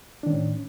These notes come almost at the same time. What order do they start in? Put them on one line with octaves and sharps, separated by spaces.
D4 D#3 C#4 A2